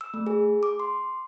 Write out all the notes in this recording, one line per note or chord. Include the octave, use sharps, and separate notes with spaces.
E6
A3
G#4
D6
C6